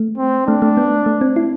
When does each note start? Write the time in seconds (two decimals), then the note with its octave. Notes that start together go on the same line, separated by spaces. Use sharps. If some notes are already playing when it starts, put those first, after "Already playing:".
Already playing: A3
0.18 C4
0.47 A3 D4
0.62 A3
0.77 B3
1.06 A3
1.21 C4
1.36 E4